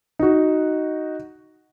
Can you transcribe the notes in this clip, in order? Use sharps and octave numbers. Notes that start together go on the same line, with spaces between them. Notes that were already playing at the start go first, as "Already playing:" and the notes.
D#4 F#4